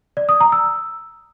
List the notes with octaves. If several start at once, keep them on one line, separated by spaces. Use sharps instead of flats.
D5
D#6
A#5
E6